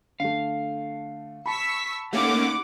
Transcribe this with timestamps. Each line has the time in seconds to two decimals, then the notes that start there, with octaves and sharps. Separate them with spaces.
0.20 D3 A3 F5
1.46 A5 B5 C#6 E6 B6
2.13 A3 A#3 C#4 D#4 G4 F#5 D6